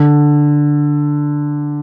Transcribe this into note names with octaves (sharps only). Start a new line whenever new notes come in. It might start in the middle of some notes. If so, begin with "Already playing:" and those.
Already playing: D3